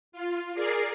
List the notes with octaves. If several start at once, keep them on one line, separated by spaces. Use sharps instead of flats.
F4
G#4 A#4 D5 C7